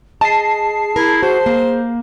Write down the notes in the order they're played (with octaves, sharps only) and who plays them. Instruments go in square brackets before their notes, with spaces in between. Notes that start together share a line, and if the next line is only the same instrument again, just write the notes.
[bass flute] G#4 [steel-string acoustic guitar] D#5 [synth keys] A5 C7
[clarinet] E4 [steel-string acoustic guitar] A#4
[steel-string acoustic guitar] F#4 [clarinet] C5
[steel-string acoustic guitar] A#3